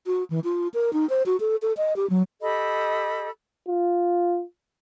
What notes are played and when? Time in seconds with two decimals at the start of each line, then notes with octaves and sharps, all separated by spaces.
0.06 F#4
0.30 E3
0.44 F4
0.74 A#4
0.93 D#4
1.10 C5
1.26 F#4
1.40 A4
1.62 A4
1.77 D#5
1.96 G4
2.10 F#3
2.41 G4 A4 D#5 B5
3.68 F4